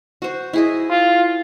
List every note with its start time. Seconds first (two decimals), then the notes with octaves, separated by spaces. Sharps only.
0.22 F#4 C5
0.53 E4 G#4 D#5
0.90 F4